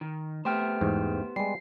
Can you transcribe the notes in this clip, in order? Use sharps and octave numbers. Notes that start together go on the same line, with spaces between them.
D#3
A3 B3 G4 C5 G5 F6
E2 G#2
G3 G#3 C7